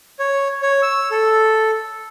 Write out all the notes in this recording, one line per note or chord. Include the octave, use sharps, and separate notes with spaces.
C#5
C#5
E6
A4